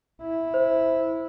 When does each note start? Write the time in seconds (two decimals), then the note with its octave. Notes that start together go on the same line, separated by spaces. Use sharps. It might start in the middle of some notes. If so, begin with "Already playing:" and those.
0.22 E4
0.54 C5